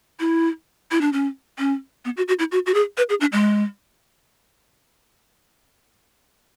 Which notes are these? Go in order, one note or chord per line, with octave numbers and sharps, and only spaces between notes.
E4
E4
D4
C#4
C#4
B3
F#4
F#4
E4
F#4
F#4
G#4
B4
G#4
D4
G#3